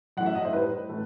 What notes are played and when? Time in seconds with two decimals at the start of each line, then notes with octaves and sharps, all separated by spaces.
0.17 F#2 E3 A3 F#5
0.26 E5
0.35 D#5
0.45 C5
0.53 A2 G3 B4
0.89 A2 E3 A3